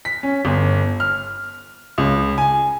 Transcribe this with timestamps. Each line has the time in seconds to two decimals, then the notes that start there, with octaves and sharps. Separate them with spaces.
0.05 B6
0.23 C#4
0.45 G1
1.00 F6
1.98 C#2
2.38 G#5